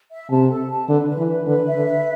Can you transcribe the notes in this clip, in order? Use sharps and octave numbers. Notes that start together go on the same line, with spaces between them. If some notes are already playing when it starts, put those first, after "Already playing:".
E5
C3 A5
A4
A5
D3 B4
B4
E3
B4
D3 B4
E5
D3
B4